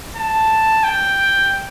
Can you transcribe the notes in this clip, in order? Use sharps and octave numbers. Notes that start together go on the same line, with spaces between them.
A5
G5